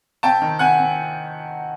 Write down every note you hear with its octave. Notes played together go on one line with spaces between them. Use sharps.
C3 G5 A5
D#3
C3 F#5 G#5
C3